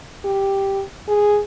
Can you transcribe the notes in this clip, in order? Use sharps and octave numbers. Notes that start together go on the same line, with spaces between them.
G4
G#4